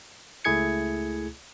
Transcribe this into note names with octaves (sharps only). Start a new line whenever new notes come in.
C#2 A3 E4 G#4 G#6 C#7